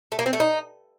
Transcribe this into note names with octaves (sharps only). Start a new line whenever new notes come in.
A3
A#3
C4
A3
D#4